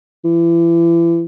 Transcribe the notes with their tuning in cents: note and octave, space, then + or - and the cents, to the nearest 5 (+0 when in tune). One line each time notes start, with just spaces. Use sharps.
E3 +35